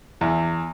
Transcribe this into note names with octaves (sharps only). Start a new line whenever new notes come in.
E2